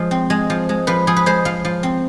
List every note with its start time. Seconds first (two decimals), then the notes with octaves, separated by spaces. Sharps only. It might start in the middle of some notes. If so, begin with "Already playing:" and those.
Already playing: F3 G#3
0.11 C4
0.30 G#3
0.50 F3
0.69 G#3
0.87 F3 B4
1.07 F3 G#4
1.17 B4
1.26 G#3 C5
1.45 F3 F5
1.65 F3
1.83 C4